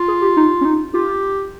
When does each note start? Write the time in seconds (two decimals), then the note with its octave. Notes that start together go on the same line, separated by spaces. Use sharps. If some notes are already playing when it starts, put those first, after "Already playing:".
Already playing: F4
0.08 G#4
0.22 G4
0.37 D#4
0.61 C#4
0.65 D#4
0.94 F4 G4